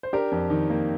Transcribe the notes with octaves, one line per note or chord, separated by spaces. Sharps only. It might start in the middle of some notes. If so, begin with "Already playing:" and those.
C5
D4 G4 A#4
F2
D#3
A#3